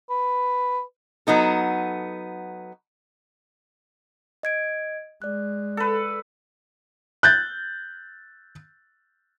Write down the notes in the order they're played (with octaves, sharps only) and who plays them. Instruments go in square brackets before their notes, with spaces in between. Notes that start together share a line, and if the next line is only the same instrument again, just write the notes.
[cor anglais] B4
[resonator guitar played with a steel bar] F#3 B3 D#4 A4
[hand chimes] D#5 G#6 D7
[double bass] G#3 [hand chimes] D5 F#6
[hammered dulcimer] A4 B4
[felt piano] F#6 G6 A6